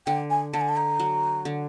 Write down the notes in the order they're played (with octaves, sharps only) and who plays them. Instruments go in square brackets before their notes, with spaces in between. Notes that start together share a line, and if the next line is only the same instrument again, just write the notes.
[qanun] D3 [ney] G5
[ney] G#5
[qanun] D3 [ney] A5
[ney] G#5
A5
A#5
[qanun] F#3
D3